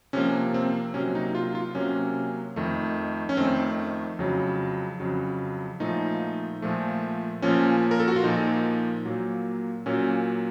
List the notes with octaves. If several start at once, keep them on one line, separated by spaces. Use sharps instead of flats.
C3 F3 A#3 C#4
C4
C3 F#3 A#3 C#4
D#4
F4
F4
C3 F#3 A#3 C#4
F2 D#3 A3
C#4
F2 D#3 A3 C4
F2 C#3 F#3
F2 C#3 F#3
A#2 F3 A3 D#4
A#2 F3 A3
A#2 F3 A#3 C#4
A#4
A4
F#4
F4
A#2 F3 A#3 D#4
A#2 F#3 A#3
A#2 F#3 A#3 C#4